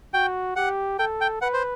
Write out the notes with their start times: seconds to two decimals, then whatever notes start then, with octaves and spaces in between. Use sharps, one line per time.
0.14 F#4 G5
0.56 G4 F#5
0.99 A4 G5
1.21 G5
1.41 B4 F#5
1.53 C5